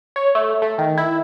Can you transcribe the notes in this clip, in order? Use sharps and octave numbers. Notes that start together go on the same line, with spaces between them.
C#5
A3
A3
D#3
E4